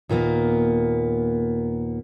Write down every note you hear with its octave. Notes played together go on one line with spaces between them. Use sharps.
D#2 A#2 A#3 B3